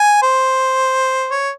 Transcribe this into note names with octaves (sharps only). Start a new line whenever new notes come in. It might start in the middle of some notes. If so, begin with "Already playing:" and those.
Already playing: G#5
C5
C#5